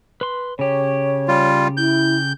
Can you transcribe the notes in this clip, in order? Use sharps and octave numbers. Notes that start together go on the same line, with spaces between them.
B4 C6
C#3 G4 C#5
G3 F4
E4 G6